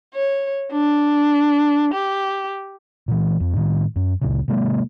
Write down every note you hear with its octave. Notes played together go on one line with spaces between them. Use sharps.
C#5
D4
G4
A#2 E3
F2
A2 D#3
F#2
C#2 A#2 C#3
C3 F#3 G#3 A#3